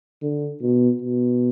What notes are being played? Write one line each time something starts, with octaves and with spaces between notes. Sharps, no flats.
D3
B2
B2